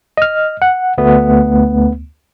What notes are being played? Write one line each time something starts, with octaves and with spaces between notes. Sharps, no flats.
D#5 F6
F#5
D2 A3 B3